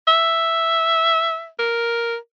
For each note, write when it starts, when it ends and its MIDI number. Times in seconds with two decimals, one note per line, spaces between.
0.08 1.48 76
1.59 2.16 70